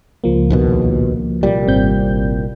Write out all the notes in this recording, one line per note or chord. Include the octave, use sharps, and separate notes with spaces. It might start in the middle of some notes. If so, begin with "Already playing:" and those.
C#2 F3 A#3
A#1 D#2 B2
C2 A#2 G3
G#1 C4 G6